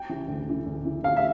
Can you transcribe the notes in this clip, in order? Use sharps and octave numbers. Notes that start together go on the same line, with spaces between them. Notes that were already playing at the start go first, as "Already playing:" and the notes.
Already playing: G5
C#3 E3
D2
C#3 E3
D2
C#3 E3
D2 F5
E5